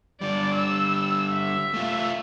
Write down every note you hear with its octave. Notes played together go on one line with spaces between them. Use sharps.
D3 G3 D5
E6
E5
A3 F4